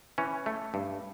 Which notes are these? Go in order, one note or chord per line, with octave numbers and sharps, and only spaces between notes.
E3 C#4
A3
G2